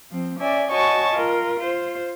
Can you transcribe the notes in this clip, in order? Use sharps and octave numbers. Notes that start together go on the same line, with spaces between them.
F3 C4
C#4 D5 E5 G#5
F#4 C#5 D#5 G#5 A5 C#6
F4 A#4
F4 C5